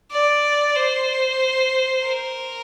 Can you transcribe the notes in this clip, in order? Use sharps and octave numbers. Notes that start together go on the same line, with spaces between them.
D5
C5
A#4